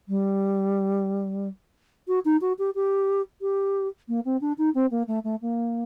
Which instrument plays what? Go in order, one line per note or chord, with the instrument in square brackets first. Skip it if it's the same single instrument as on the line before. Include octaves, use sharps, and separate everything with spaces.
[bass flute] G3
F#4
D#4
F#4
G4
G4
G4
A#3
C4
D4
D#4
C4
A#3
A3
A3
A#3